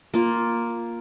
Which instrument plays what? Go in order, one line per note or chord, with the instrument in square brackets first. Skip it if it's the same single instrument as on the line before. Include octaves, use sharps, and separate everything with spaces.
[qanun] A#3 F4